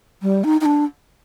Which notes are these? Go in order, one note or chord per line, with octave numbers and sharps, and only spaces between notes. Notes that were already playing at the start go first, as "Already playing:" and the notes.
G3
D#4
D#4
D4